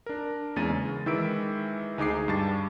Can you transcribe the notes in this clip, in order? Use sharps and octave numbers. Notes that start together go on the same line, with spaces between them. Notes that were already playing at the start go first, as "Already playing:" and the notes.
D4 A#4
E2 G#3 A#3 C#4 A6 D#7
C#3
D#3 E3 G#3 E6 B6 D7
D2 D#4 G#4 D6 C7
G2 G3 A5 A6